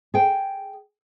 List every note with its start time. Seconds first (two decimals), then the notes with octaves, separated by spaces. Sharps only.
0.14 G#4 G5